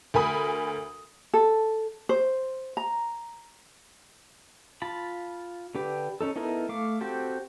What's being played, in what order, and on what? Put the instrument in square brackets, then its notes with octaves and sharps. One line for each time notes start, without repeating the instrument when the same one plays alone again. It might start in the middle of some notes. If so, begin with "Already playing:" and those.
[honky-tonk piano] D2 A#4 G#5 B5 D#6
[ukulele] A4
C5
A#5
[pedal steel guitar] F4 A5 B5
D3 D4 G4 B4
C#4 D#4 A4
B3 D#4 E4 A4 A#4
A3 F5 D6
C4 F#4 G4 A4 C5